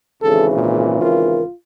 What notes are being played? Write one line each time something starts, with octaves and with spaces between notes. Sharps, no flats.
G#1 C#3 E3 G#4 A4
A#2
F4 A#4